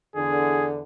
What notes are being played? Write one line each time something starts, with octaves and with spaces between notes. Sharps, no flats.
E2 D3 G#4